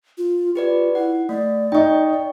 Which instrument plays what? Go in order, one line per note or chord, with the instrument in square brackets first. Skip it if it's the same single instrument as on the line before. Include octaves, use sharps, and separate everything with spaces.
[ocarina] F4
[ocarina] F4 [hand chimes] G4 B4 D5
[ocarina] E4 [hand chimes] F#5
[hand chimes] A3 [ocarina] D5
[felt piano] D#4 D#5 [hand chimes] G5 C#6